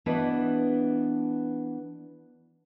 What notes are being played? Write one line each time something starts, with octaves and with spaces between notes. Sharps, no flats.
E3 B3 D4 F#4 B4 D#5